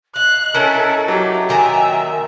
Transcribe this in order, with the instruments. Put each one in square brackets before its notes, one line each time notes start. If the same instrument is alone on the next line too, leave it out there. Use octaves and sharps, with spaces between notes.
[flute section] D#5 [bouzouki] F5 [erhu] F#6
[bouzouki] A3 C#4 E4 [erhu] A4 [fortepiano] A#4
[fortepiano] F#3 [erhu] G4
[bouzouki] A#2 D#3 A#5 [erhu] E5 [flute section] G5 G#5